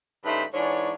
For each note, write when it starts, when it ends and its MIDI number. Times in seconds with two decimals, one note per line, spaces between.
0.25 0.43 43
0.25 0.43 49
0.25 0.43 57
0.25 0.43 63
0.25 0.43 72
0.25 0.43 83
0.53 0.92 44
0.53 0.92 52
0.53 0.92 62
0.53 0.92 73